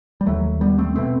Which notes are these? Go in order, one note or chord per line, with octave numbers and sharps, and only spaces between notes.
G3
D#2 F#3 A3
G3 B3
A3 C4
B2 A3 C4